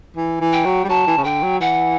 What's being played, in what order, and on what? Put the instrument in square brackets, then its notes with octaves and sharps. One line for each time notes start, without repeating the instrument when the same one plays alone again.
[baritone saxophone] E3
E3
[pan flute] G5
[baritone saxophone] F#3
G3
[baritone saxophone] F#3 [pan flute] A5
[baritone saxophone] E3
C#3
[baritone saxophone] D3 [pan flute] G5
[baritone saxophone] F#3
[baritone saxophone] E3 [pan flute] F#5